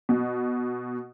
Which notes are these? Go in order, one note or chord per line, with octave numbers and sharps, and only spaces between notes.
B2